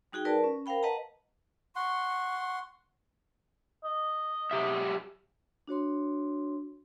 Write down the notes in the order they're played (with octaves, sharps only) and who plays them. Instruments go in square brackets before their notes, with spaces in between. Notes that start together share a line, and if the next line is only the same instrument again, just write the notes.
[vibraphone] G3 D#4 F#4 G#4 G5
A#4 B4 D5 A5
C#4
A#4 C5 F5 G5 B5
B4 D#5 F#5 A5 A#5
[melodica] F#5 C6 [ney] C#6
[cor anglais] D#5
[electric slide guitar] F#3 G4 E5
[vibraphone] D4 F#4 C#5 C6